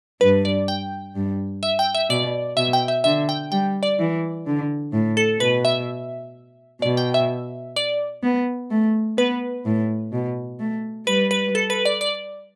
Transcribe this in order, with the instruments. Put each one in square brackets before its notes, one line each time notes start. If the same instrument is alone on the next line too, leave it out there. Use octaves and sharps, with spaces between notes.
[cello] G2 [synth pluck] B4
[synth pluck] D5
G5
[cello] G2
[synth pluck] E5
G5
E5
[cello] B2 [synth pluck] D5
[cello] B2 [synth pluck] E5
[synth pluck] G5
E5
[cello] D3 [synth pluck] E5
[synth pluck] G5
[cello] G3 [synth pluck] G5
[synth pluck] D5
[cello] E3
D3
A2
[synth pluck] A4
[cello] B2 [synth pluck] B4
[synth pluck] E5
[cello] B2 [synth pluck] D5
[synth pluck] G5
E5
D5
[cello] B3
A3
[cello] B3 [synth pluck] B4
[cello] A2
B2
A3
[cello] G3 [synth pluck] B4
[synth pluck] B4
A4
B4
D5
D5